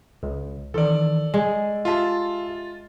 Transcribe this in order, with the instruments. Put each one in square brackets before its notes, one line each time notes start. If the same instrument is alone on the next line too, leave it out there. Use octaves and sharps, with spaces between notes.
[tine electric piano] C#2
[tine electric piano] D#3 E3 [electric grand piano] A4 D5
[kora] G#3 [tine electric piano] D#5
[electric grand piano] F4 A5 [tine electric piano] G4 E5 F5